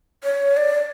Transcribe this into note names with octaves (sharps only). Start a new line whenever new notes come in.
C#5
D5